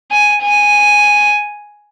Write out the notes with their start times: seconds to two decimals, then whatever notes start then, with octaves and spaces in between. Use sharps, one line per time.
0.11 G#5
0.42 G#5